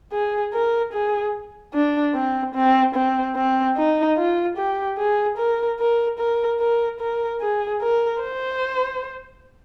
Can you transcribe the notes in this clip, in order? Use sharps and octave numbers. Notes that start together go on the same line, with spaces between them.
G#4
A#4
G#4
D4
C4
C4
C4
C4
D#4
F4
G4
G#4
A#4
A#4
A#4
A#4
A#4
G#4
A#4
C5